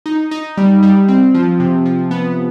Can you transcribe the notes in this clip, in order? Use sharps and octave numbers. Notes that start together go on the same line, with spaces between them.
D#4
D#4
G3
G3
C4
F3
C3
F3
B3